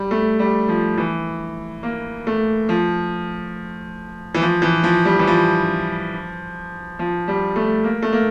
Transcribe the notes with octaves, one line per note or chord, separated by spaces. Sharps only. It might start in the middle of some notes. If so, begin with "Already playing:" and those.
Already playing: G3
A3
G3
F3
E3
A#3
A3
F3
E3
F3
E3
F3
G3
E3
F3
F3
G3
A3
A#3
A3
A#3